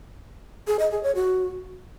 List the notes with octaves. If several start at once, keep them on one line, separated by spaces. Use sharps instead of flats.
G#4
D#5
G#4
C#5
F#4